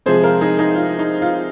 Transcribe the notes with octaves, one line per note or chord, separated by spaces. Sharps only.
C3 F3 G#3 G#4 C5
F4 A#4
D#4 G#4
D#4 G#4
F4
D#4
F4